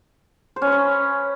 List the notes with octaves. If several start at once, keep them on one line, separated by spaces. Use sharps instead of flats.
C5
C#4
B4
C#5